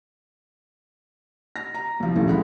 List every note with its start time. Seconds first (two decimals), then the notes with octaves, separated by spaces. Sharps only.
1.56 A#6
1.74 A#5
2.00 C2 F3
2.15 D#1 A1 D2 E3 F3
2.28 G#3 F#5 B5